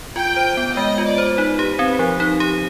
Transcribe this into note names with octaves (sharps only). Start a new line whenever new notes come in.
F4 G5
C5
B3
G#3 D#5
F4
D5
C5
D#4 B4
G4
C4
F3
D#4
G4